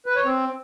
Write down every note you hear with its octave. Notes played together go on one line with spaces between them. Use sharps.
B4
C#5
C4